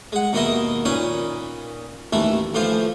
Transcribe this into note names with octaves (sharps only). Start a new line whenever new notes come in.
G#3 F#5
D#2 B2 A#3 D#4 E4 D#5
A#2 C#4 D#4 B4 G#5
A1 D#2 E3 A3 E4
A2 E3 F3 F4 C5